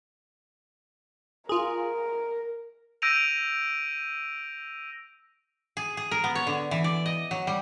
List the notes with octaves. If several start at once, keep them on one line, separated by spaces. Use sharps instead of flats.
F4 G#4 A#4
E6 G6 A#6 D7 D#7 F7
G#4
G#4
A#4
B3
C#5
D3
E3
D5
D#5
F#3
G3